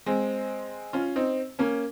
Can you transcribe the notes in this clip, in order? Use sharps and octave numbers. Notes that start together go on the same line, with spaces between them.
G#3 C4
C#4 F4
C4 D#4
A#3 C#4